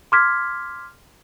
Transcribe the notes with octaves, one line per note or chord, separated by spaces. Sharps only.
C6 D6 F6 G#6 B6